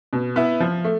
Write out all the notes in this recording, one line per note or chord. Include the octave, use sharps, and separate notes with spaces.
B2
B3 E4
F3
A3